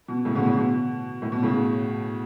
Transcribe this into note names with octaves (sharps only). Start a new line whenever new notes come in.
B2
A2 C#3
B2 D3
A2 C#3
B2
A2
B2
A2 C#3
B2